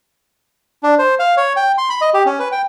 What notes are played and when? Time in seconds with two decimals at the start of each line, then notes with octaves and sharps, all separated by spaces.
0.83 D4
0.99 C5
1.19 F5
1.37 C#5
1.56 G5
1.78 C6
1.89 B5
2.01 D#5
2.14 G4
2.26 C#4
2.39 B4
2.52 G5